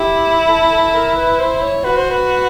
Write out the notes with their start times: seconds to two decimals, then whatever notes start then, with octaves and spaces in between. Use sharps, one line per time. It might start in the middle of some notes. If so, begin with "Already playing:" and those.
Already playing: E4 G4
0.48 A4
0.72 A4
0.94 A#4
1.16 B4
1.39 C5
1.62 C#5
1.84 F#4 B4
1.97 C5
2.10 B4